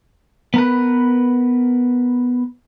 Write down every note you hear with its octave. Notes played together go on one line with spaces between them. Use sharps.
B3 A#4 B4